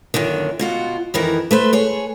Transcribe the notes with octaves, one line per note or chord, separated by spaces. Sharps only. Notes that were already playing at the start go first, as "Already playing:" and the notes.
F#2 A#2 D3 D#3
B2 F4 F#4
F2 D#3 E3 A#4
A3 B4 C5
G#4 C#5